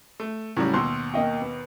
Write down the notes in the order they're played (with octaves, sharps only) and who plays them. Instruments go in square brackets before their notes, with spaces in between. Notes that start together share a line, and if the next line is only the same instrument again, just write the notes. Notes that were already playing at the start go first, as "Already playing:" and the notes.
[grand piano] A3
[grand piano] A2 F#3 G3 [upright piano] C#3
[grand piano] D#2 B2 [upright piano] C6 E6
[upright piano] A#3 D#5 G5
B3